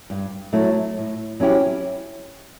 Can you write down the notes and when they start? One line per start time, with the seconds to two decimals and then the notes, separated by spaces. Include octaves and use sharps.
0.10 G2
0.53 F#3 A3 E4
0.97 A2
1.40 F#3 C#4 E4 G4